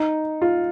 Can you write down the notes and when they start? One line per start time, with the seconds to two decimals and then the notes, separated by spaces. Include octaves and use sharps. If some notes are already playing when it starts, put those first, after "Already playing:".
Already playing: D#4
0.42 F4